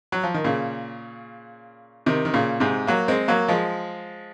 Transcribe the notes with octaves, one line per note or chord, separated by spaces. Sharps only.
F#3
F3
D#3
A#2 C#3
C3 D#3
D#3
A#2 C#3
G#2 C3
F#3 A#3
G#3 C4
F#3 A#3
F3 G#3